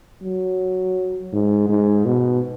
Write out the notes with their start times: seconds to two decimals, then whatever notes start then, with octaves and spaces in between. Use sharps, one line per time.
0.22 F#3
1.33 G#2
1.69 G#2
2.05 B2